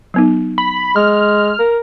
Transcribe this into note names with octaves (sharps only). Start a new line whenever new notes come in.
F#3 B3 D#4
B5
G#3 F6
A#4